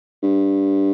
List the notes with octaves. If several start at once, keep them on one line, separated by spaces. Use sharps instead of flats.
G2